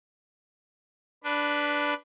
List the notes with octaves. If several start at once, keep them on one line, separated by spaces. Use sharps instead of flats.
D4 B4